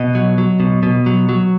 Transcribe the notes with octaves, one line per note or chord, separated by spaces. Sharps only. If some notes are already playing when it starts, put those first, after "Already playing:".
Already playing: B2 D#5
F#3
F#3
B2
B2
F#3
F#3